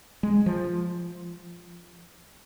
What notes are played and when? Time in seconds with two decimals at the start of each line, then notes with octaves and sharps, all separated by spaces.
0.23 G#3
0.46 F3